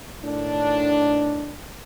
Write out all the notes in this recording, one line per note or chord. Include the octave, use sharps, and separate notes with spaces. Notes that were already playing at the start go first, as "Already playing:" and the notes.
A2 D#3 D4